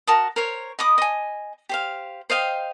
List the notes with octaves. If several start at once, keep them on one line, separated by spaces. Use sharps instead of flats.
F#4 A#4 A5 D#6
A#4 C5 C#5
D#5 B5 D6 D#6
D#5 G#5
G4 C5 F5
C5 D#5 F5 G5